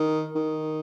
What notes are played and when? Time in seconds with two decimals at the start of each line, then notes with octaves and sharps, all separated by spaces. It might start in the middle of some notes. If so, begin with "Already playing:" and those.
Already playing: D#3
0.35 D#3